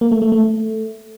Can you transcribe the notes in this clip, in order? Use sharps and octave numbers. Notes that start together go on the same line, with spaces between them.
A#3
A3
A3
A3